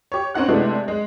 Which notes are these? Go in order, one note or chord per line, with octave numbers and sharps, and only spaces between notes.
G4 C#5
C4 C#4 D#4 F#5 F#6
C3 G#3 A3 B3 D4 E4
G#3